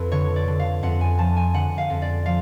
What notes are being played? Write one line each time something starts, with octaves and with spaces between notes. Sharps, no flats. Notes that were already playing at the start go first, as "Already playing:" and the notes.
Already playing: F2 A4 B4
D3 C#5
D5
D3
F5
F2 F#5
G#5
F3 A5
G#5
D3 F#5
F5
F2
D5
F3 F5